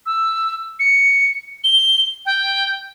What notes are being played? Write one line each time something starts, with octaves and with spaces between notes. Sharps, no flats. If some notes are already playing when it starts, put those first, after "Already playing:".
E6
C#7
G7
G5